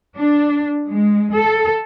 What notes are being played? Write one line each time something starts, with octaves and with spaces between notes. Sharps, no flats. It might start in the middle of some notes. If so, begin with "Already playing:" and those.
D4
G#3
A4